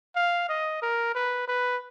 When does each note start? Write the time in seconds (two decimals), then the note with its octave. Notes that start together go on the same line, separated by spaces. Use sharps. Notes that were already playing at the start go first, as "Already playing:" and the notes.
0.16 F5
0.49 D#5
0.83 A#4
1.15 B4
1.48 B4